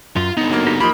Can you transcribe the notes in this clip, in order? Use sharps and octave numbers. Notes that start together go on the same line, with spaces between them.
F#2 F4
D3 B3 D#4
F#3 A#3
D#4 G4
F3 A#3 D#4 F4 G4 B5